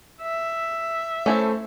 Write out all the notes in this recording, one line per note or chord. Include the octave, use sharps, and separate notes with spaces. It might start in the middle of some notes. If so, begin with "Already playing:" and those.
E5
A3 C#4 E4 A4 C5